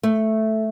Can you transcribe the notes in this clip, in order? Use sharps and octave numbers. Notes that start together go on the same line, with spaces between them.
A3